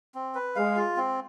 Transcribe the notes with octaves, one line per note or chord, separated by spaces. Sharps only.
C4
B4
G#3 F5
F4
C4